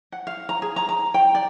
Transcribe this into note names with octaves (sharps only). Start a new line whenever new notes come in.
F#5
F5
A#5
G#4
A#5
A#5
G5
D5